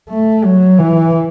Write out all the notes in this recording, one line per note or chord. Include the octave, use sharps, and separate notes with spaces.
A3
F#3
E3